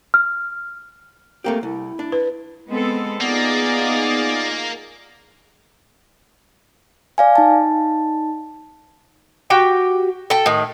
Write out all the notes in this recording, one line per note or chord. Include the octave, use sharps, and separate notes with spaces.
F6
A3 A#3 C4 G4
C2 E4
D4
B4
G#3 B3 C4 A4
A#3 B3 D#4 F4 G#4 D5
D5 F5 G#5
D#4 A5
F#4 G4 G5
A4 G5
A2 D#3